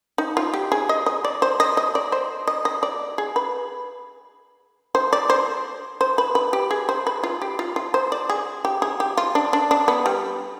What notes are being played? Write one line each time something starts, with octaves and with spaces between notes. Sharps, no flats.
D#4
F4
G4
G#4
D#5
D#5
D5
C5
D#5
D#5
D5
C5
D#5
D#5
D5
G#4
B4
C5
D5
C5
C5
B4
B4
G4
G#4
C5
B4
F4
G4
F4
F4
C5
D5
G#4
G4
G#4
G4
F4
D4
D4
D4
B3
G3